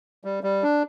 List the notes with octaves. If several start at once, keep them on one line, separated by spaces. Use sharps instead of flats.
G3
G3
D4